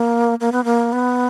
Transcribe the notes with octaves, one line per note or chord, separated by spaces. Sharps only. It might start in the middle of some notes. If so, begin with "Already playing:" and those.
Already playing: A#3
A#3
B3
A#3
B3